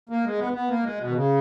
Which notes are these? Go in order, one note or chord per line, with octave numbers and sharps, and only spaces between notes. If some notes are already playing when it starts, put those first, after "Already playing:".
A#3
G#3
B3
B3
A#3
G#3
B2
D#3
C#3